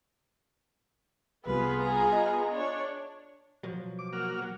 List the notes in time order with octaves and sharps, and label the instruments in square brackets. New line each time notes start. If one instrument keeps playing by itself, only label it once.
[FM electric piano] C2 C3 G3 [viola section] B3 F4 G#4 [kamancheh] B4
[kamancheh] G#5 A#5
[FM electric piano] D#5
[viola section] D4 [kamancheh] C#5
[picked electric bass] B2 F3 F#3
[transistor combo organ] D6
A#3 F#4 F6
[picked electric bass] F#3